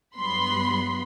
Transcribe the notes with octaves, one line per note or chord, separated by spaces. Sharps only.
G2 F#3 B3 B5 C6